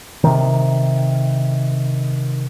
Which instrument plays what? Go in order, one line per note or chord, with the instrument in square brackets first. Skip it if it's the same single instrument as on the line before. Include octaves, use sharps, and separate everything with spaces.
[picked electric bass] C3 D#3